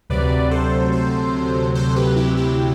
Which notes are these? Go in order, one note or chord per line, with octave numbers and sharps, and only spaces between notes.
D2 C3 F#3 B4 D5
A4 C5
A4 C5
A4 C5
G4 B4
E4 G4
E4 G4